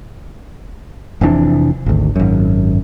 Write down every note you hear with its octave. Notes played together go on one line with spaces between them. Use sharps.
F1 C3 E3 D4
G#1 D2
G#1 F#2